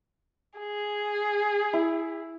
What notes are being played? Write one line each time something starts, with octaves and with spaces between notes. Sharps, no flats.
G#4
E4